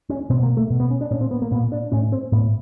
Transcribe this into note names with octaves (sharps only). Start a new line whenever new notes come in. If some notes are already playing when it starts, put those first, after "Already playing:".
C#4
B2 C4
A#3
A3
B2
B3
C#4
D4
A#2 C#4
C4
B3
A#3
A#2 B3
D4
A2 C#4
C4
A2 B3